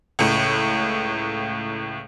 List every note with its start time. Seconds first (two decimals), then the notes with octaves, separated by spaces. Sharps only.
0.19 C#2 A2